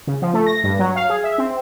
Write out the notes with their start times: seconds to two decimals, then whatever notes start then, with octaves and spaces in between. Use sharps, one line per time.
0.07 C#3
0.22 F3
0.34 A3
0.47 A#6
0.64 G2
0.79 F#3
0.96 F5
1.09 G#4
1.24 E5
1.38 C4